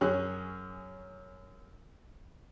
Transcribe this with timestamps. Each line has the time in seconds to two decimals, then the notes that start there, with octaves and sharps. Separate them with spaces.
0.01 F#2 C#4 G#4 F#6